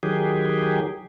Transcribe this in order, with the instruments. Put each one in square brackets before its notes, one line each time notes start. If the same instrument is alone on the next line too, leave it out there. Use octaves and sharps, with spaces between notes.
[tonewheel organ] D#3 F#3 G4 G#4